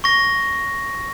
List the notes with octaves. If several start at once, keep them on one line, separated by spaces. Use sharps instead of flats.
C#6 A#6